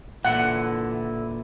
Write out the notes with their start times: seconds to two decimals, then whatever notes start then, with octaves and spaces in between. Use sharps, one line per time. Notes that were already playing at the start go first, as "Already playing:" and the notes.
0.25 A#2 D3 E3 E4 F#5